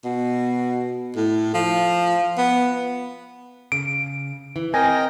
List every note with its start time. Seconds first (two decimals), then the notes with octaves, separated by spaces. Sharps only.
0.05 B2
1.16 A2
1.54 F3
2.38 B3
3.72 C#3 D7
4.56 E3
4.74 C4 A#4 D#5 G5 G#5 A#6